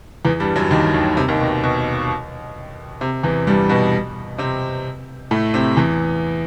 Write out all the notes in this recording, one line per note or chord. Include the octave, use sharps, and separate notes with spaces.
E2 E3
G2 G3
F#2 F#3
D#2 D#3
D#2 D#3
C3
D#2 D#3
B2
B2
C3
E2 E3
G2 G3
B2 B3
C3 C4
A2 A3
C3 C4
E2 E3